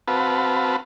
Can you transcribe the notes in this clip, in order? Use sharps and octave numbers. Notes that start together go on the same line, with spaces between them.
C4 F#4 B4 F5 A5 B5